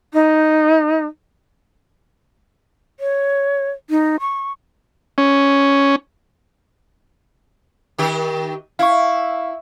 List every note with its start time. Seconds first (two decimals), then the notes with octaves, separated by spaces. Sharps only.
0.13 D#4
3.00 C#5
3.90 D#4
4.20 C#6
5.18 C#4
7.98 D#3 G4
8.79 E4 F5 C#6